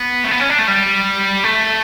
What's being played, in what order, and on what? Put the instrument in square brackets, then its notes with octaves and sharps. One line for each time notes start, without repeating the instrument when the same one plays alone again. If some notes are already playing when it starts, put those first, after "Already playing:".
Already playing: [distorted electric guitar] B3
A3
B3
C#4
D4
A3
G3
A3